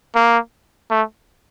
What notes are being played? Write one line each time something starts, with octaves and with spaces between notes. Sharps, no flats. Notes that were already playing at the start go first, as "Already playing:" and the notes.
A#3
A3